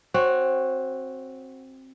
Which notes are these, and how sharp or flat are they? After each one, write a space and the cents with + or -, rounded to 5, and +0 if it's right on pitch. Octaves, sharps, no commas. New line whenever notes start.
C4 +15 F#4 +0 C#5 +0